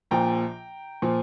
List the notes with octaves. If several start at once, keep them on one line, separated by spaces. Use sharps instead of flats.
A#1 A#2 F3 G5 A#5
A#2 F3